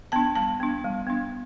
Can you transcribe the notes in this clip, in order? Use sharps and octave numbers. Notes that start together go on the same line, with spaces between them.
B3 D4 A5
G3 A5
B3 D4
G3
B3 D4